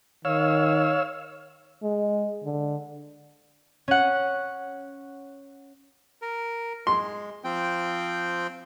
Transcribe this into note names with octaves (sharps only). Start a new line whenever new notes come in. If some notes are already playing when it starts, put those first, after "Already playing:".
D#3 C#5 F5 E6
G#3
D3
C#4 F#5
A#4
G#3 C6
F3 C4 G5